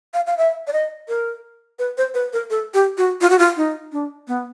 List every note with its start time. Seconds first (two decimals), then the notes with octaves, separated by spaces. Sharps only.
0.14 F5
0.27 F5
0.38 E5
0.67 D5
0.73 D#5
1.08 A#4
1.79 B4
1.98 C5
2.14 B4
2.33 A#4
2.50 A4
2.74 G4
2.98 F#4
3.21 F4
3.30 F#4
3.39 F4
3.57 D#4
3.92 D4
4.28 B3